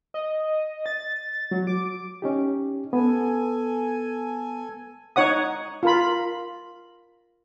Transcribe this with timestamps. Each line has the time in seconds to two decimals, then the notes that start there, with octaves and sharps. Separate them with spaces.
0.14 D#5
0.86 A6
1.51 F#3
1.67 D6
2.22 C#4 D#4 G4
2.93 B3 A4 G#5
5.16 D#4 C#5 F#5 D#6
5.83 F4 A#4 B5